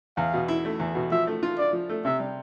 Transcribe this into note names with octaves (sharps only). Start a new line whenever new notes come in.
E2 F5
B2
E4
A3
E2
B2
F3 E5
A3
F4
D4 D5
F3
A3
C3 E5
G3